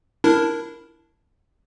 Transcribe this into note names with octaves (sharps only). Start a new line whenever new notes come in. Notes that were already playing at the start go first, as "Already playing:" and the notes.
D4 E4 A#4